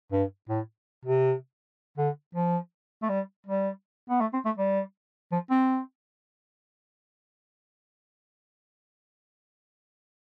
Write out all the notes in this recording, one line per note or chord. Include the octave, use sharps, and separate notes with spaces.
G2
A2
C3
D3
F3
A3
G3
G3
B3
A3
C4
A3
G3
F3
C4